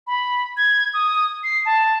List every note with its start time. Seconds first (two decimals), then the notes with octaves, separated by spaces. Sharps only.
0.07 B5
0.57 G#6
0.94 D#6
1.44 C7
1.66 A5